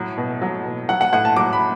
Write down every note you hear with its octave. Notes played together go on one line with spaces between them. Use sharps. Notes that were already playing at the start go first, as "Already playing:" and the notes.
Already playing: A2 F#3
B2
F#3
B2
F#3 F#5
F#5
A2 F#5
A5
F#3 D6
B5